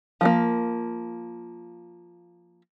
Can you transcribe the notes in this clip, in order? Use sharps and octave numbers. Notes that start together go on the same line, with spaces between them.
F3 G3 A#3